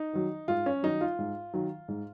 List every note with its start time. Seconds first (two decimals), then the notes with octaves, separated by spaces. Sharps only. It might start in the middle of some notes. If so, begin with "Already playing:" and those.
Already playing: D#4
0.13 D#3 F#3
0.48 G#2 F4
0.66 C#4
0.83 D#3 F#3 D#4
1.01 F4
1.19 G#2
1.54 D#3 F#3
1.88 G#2